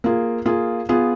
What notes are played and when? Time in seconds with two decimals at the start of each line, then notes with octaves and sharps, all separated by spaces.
0.04 A#3 F4 G#4
0.45 A#3 F4 G#4
0.89 B3 F4 G#4